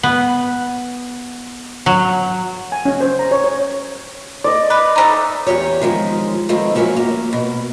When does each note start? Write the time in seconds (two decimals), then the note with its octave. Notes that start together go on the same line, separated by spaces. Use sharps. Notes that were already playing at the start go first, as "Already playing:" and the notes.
0.03 B3
1.86 F#3
2.72 G#5
2.85 C#4
3.01 C5
3.19 A#5
3.31 C#5
3.44 C#5
4.44 D5 D#5
4.70 B4
4.96 A3 C#4 D#4
5.47 E2 G2 G4 C#5
5.82 D#3 F3 G#3
6.49 B2 D#3 F3 G#3 A3 C4
6.75 F3 F#3 A3 A#3 C#4 E4
6.97 A#3
7.33 B2